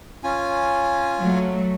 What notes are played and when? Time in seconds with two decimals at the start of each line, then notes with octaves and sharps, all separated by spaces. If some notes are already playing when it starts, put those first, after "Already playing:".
0.24 C#4 F4 G#5
1.20 F#3 A3